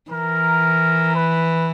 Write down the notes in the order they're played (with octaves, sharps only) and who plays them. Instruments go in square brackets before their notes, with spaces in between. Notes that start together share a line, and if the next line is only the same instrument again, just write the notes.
[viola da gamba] E3 [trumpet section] A#4
[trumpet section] B4